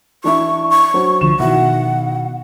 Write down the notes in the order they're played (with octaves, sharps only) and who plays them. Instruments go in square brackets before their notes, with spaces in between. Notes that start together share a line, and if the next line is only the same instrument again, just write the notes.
[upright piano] E3 D4 E4 [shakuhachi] C#6
[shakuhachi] C#6
[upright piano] F#3 D4 C5
[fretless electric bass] C2 D3 F3 [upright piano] E7
[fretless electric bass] B2 D#3 [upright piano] E4 F#4 [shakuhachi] F#5